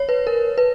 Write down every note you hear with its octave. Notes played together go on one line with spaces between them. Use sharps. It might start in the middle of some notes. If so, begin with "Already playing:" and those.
Already playing: C#5
B4
A#4
B4